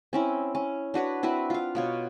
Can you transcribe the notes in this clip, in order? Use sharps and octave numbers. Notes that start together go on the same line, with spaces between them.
C4 C#4 E4
C#4
D4 F#4 B4 C#5
C4 E4 F#4 B4
F4 F5
B2 F4 C#5